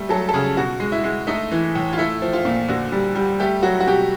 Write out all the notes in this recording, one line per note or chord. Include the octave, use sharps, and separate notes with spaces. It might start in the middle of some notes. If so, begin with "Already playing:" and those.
Already playing: G3 A3
F#3 A4
A4
C#3 G#4
B2 F#4
G#3
E4
G#3
A3 D#4
E3
A2
F4
A3 E4
F3
F4
A#2
D3 F#4
G3
G3
A3 G4
F#3 F#4
F#4
B2 G4